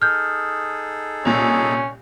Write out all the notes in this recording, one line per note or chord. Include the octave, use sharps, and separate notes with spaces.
D#4 G#4 A4 F6 G6
C2 A#2 C#4